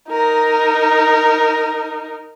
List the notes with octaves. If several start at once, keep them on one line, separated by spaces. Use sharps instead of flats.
D#4 A#4